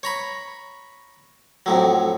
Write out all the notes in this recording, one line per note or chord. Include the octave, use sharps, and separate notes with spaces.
C#5 A#5 B5
F2 A2 F#3